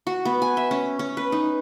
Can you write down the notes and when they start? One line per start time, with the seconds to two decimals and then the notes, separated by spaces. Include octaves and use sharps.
0.07 F#4
0.25 B3
0.42 G#5
0.57 E5
0.71 C#4
0.99 C#4
1.17 B4
1.32 D#4